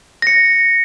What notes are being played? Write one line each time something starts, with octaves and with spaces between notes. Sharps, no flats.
A#6 C#7